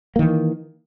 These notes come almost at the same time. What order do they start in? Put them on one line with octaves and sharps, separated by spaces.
A#3 D#3 E3